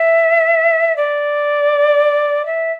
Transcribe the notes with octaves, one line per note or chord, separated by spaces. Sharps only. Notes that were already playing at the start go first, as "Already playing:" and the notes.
Already playing: E5
D5
E5